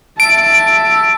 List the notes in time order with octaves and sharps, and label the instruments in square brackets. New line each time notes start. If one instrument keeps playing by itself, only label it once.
[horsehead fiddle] E5 A5 [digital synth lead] D7